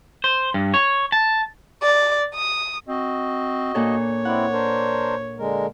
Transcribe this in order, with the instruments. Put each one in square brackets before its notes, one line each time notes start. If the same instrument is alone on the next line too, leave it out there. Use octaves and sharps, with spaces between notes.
[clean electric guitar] C5
G2
C#5
A5
[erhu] D5
D#6
[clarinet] C4 [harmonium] F#4 D#5
[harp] A#2 D4 A4 [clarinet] C#5
[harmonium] C4 E4 [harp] D5 F#5
[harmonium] D4 A#4 C5
D3 G#3 A#4